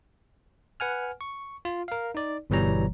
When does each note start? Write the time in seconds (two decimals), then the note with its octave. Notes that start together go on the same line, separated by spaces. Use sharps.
0.80 B4 F#5 G#5 F6
1.21 C#6
1.65 F4
1.88 A#4 F5
2.15 D#4 D5
2.50 G1 B2 E3 G3 C#5 A#5